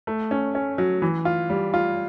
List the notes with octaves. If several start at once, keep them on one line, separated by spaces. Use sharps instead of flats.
A3
C#4
C#4
F#3
E3
F4
G3
F4